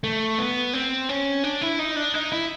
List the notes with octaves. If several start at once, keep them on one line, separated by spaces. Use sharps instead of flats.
A3
B3
C4
C#4
D4
E4
D#4
D4
D#4
E4